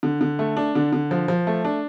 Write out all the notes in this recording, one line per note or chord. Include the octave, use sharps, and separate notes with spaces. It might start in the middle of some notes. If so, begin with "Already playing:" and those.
D3
D3
A3
D4
D3
D3
F3
F3
A3
D4